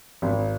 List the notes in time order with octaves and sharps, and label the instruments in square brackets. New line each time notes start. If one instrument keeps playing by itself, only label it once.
[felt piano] G#1